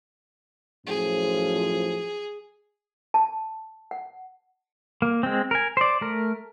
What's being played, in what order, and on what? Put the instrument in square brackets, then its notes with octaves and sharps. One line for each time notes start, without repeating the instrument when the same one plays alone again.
[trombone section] F#2 A2 F3 [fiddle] G#4
[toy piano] A5
F#5
[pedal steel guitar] A#3
G#3 C4
A#4 G#5
C5 D5
A3 A#4